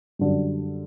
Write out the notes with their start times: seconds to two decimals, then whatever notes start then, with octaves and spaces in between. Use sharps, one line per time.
0.19 F#2 D3 G3